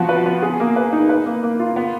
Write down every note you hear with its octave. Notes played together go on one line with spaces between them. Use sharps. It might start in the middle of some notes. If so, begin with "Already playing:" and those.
Already playing: F3 B3 F#4
B4
B3
G#4
A#3
B4
D#4
B4
A#3
A#3
F4
B3